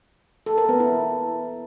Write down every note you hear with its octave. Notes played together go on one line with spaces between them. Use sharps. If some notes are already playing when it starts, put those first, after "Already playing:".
A4
A#4
B3
E4